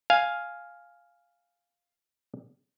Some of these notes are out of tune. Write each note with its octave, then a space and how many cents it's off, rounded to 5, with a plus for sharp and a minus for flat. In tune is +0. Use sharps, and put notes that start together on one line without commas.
F5 +0 G#5 +0